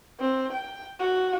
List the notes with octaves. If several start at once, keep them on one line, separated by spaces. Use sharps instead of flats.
C4
G5
F#4